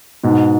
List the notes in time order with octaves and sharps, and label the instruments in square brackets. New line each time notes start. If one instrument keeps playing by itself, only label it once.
[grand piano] G#2 [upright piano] B2